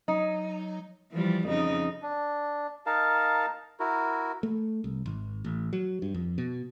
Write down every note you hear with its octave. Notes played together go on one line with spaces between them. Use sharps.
F#3 D#4
E3 F3 G3
F2 C#3 D#4
D4
D#4 A#4 F5 A5
E4 F#4 A#4
A3
C2
G#1
A1
F#3
G2
F2
B2